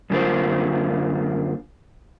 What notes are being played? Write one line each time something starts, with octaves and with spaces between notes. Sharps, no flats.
F#2 D3 A#3 F4 C5